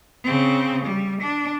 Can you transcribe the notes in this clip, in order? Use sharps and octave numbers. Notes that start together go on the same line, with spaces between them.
C#3 C4
G3
D4